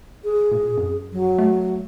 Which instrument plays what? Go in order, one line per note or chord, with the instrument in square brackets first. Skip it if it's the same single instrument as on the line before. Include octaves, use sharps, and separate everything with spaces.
[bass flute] G#4
[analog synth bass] A#2
F#2
[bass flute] F#3
[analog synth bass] A3